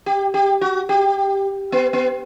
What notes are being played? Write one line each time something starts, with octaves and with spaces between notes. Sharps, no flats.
G4
G4
F#4
G4
B3
B3